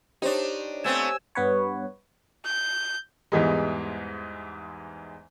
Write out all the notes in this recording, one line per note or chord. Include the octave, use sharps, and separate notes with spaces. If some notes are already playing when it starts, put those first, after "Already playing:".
D4 D#4 G4 C5 C#5
A3 B3 C4 G#5 E6
G2 B3 B4 C#5
G6
E2 G#2 E3 G3 G#3